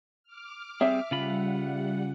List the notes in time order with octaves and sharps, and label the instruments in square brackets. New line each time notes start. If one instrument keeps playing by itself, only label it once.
[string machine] D6 F6
[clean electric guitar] G3 C4 G#4 [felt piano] E5
[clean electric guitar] C#3 F4 B5 [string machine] G3 F#5